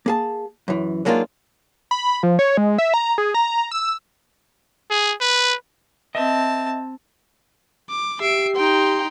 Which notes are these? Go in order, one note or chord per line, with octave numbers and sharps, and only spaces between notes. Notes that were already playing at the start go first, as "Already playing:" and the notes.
A#3 G#4 A5
F#2 E3
F#3 G#3 A#3 D4 D#4 F4
B5
F3
C#5
G#3
E5
A#5
G#4
A#5
E6
G#4
B4
C4 D#5 E5 A5
D6
G4 E5 C7 D7
D#4 G5 A#5 C6